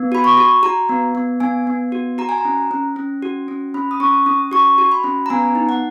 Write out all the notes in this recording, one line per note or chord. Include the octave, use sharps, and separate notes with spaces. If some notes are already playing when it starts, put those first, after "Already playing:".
Already playing: B3
F#4 B5
C#6
F#4
F#4 A#5
B3
B3
B3 G#5
B3
F#4
F#4 A#5
G#5
A#5
C#4
C#4
C#4
F#4
C#4
C#4 B5
D#6
C#4 C#6
C#4 D#6
F#4 C#6
F#4
B5
C#4
A#5
B3 G#5
D#4
F#5